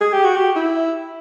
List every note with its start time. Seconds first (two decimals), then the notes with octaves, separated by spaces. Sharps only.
0.01 G#4
0.13 G4
0.24 F#4
0.36 G4
0.56 E4